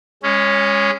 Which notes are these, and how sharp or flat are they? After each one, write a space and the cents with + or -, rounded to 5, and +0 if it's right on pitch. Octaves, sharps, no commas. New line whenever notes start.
G#3 -25 C#4 +0